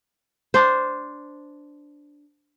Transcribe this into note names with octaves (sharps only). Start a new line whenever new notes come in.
D4 C5